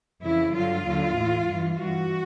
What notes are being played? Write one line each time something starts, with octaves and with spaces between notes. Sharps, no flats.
F2 C#3 E3 E4
G2 D3 F#3 F4
D#2 D3 F#3
A2 E3
G2 E3
G2 E3 F#4